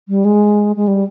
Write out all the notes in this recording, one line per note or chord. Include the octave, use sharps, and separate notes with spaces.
G3
G#3
G#3
G3